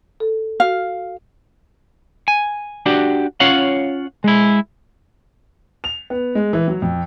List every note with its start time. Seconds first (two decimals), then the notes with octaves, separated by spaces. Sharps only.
0.20 A4
0.60 F#4 F5 F6
2.28 G#5
2.86 D4 F#4 G4
3.40 C#4 F4 C#5 F5 F#5
4.24 G#3 E4
5.84 F7
6.10 B3
6.35 G#3
6.53 E3
6.68 F#3
6.82 F2